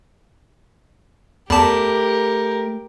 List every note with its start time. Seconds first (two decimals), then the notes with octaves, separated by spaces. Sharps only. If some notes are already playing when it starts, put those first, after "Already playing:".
1.50 E2 A3 G4 A#4 A5 B5 D6